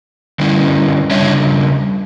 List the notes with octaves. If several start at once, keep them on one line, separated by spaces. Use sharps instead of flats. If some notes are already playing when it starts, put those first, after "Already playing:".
D3 G3 C#4 E4
C#3 E3 G3 D4 C#5 E5